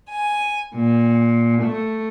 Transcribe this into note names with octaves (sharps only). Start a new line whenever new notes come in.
G#5
A#2
A3